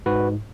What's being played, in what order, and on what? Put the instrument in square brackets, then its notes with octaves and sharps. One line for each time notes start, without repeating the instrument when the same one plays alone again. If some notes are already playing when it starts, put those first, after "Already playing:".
[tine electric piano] G#2 F#4 B4